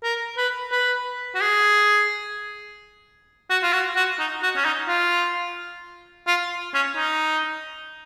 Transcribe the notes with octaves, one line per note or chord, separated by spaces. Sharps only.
A#4
B4
B4
F#4
G#4
F#4
F4
F#4
F#4
D#4
F#4
C#4
D#4
F4
F4
C#4
D#4